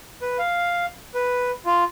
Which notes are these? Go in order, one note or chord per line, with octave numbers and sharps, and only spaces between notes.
B4
F5
B4
F4